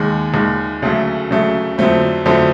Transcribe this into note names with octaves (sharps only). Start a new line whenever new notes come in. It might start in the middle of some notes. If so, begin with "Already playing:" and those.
Already playing: D#2 D#3 G#3
D#2 D#3 G#3
D2 C#3 F#3 A3
D2 C#3 F#3 A3
F2 D3 F#3 A3 C4
F2 D3 F#3 A3 C4